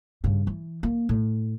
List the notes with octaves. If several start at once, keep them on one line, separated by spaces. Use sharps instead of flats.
G2 C#3
E3
A#3
A2